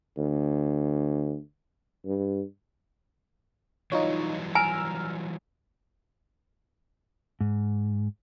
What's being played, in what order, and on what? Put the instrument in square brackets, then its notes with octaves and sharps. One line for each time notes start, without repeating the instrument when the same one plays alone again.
[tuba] D2
G2
[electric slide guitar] E3 F#3 G3 [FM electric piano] D#4 F4 C#5
[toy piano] G#5 [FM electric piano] A#5 E6 F6
[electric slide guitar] G#2